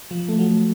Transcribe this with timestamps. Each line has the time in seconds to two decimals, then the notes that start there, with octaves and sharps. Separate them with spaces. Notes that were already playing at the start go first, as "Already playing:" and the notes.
0.11 F3
0.28 A3
0.39 F#3